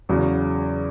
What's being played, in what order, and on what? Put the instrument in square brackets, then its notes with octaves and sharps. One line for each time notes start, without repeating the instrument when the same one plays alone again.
[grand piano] E2 C#3 F#3